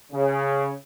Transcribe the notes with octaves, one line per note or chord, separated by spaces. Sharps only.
C#3